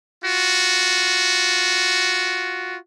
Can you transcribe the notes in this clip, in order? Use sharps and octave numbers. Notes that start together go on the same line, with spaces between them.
F4 F#4